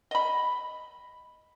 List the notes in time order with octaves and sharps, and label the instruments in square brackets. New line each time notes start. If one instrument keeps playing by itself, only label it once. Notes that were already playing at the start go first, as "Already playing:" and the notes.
[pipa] D#5 B5